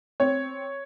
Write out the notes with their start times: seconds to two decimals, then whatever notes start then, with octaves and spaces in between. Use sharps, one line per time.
0.20 C4 C#5